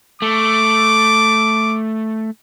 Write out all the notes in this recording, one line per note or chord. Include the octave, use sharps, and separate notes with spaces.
A3 D6